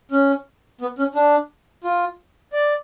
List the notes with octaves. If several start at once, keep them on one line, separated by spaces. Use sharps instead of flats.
C#4
B3
C#4
D4
F4
D5